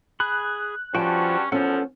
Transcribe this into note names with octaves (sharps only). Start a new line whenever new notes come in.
G#4 B5 F#6
G2 F3 C#4 F#4 G5 A5
E2 F3 B3 C#4 A4 F#5